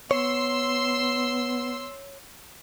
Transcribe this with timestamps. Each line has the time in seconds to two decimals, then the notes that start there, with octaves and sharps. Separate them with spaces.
0.11 B3 C#5 C6 E6